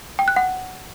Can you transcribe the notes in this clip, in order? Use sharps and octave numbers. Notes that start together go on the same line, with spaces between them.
G5
F#6
F#5